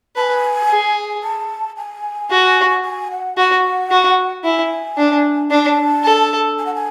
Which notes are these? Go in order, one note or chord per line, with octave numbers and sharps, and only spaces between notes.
B4 G#5 A5
G#4
A5
G#5
F#4
G#5
F#5
F#4 F#5
F#4
E4 G#5
D4
D4 A5
A4
G#5
F#5
G#5